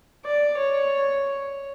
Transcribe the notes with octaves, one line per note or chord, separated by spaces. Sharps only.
D5
C#5